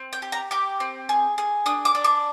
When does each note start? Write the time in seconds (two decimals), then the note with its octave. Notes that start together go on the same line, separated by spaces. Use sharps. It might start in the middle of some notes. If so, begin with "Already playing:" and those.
Already playing: C4
0.13 G5
0.22 G4
0.32 A#5
0.51 G4 D6
0.80 C4
1.09 G#4
1.38 G#4
1.66 D4 D#6
1.85 D6
1.95 D4
2.04 D6